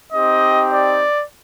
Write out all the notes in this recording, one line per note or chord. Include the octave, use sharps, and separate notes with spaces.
C4 D#4 G4 D#5
D5